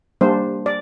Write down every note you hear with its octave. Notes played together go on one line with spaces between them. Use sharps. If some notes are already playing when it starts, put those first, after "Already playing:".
G3 A#3 D4 C5
D5